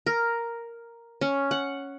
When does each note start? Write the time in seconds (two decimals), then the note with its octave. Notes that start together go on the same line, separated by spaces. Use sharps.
0.06 A#4
1.21 C#4
1.51 F#5